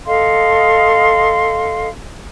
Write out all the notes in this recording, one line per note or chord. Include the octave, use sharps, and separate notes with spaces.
A4 D#5 F5 C6